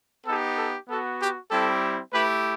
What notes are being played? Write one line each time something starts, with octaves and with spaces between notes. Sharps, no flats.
B3 D#4 G4 A4
A4
B3 F#4 A4
G4
G3 C4 E4 G4 A4
A3 E4 G4 B4